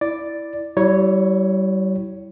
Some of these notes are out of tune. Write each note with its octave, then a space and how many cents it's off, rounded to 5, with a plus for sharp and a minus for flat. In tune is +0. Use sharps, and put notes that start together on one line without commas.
E4 +0 D5 +0
G3 -35 E4 +0 C#5 +0